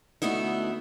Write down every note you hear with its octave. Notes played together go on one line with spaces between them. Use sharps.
D2 A3 B3 D#4 E4